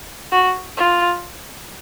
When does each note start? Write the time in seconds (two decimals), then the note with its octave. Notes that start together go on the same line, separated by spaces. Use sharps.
0.32 F#4
0.77 F4